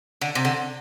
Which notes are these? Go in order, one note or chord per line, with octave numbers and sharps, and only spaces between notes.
D3
C3
D3